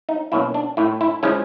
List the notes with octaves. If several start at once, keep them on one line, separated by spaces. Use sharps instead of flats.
D#4
B2 F#3 A#3 C#4 E4
D4
A2 E4
E4
F3 G#3 C#4 E4